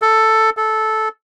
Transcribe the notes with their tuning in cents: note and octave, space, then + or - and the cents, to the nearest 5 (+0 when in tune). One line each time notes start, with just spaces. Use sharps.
A4 +5
A4 -10